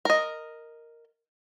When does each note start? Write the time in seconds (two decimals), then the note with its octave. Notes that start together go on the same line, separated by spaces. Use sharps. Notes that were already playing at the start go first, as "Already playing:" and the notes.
0.05 A#4 D#5